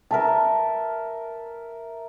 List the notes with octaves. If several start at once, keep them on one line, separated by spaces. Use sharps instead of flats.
A#4 E5 A5